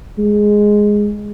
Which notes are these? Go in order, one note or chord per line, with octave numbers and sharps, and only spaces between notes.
G#3